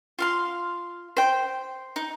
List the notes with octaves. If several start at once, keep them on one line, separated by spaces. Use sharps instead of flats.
F4 F5 C6
C5 G5
D#4